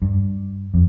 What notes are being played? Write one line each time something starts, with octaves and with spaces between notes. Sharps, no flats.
G2
F2